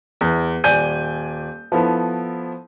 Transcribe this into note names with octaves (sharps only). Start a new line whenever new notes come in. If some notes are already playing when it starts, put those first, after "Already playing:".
E2
D#1 D5 G#5 G6 D#7
F3 B3 E4 A4